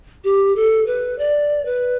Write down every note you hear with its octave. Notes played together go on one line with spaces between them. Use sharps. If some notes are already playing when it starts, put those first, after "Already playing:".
G4
A4
B4
D5
B4